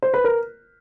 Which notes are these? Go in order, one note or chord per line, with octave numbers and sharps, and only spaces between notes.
C5
B4
A#4